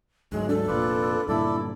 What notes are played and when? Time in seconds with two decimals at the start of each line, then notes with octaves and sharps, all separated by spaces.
0.32 D2 G#2 F#3 G#3
0.49 D4 A4
0.68 F1 A#2 F4 B4 D5
1.29 G2 A#2 D3 E4 A4 D5